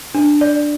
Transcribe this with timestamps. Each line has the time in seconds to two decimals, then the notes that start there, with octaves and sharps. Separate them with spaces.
0.15 D4
0.41 D5